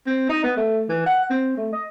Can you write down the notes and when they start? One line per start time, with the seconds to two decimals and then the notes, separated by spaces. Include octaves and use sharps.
0.07 C4
0.29 D#4
0.44 B3
0.57 A3
0.89 E3
1.06 F#5
1.30 C4
1.57 A3
1.72 D#5